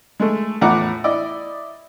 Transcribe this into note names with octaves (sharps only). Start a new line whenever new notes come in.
G#3 A3
E2 A2 F3 F#5 A#5 D6
E4 D5 D#5